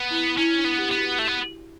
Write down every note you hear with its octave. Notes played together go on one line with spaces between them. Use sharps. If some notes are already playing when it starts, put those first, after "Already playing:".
Already playing: B3
E4
C#4 E4
D4
B3
G4
B3 G4
F#4
A3
B3